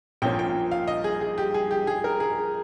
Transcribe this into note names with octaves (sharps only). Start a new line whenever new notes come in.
A#1 A#2 F3 A#3 C#4 G5
G5
F5
D#5
G#4
G#4
G4
G#4
G4
G#4
A#4
G#4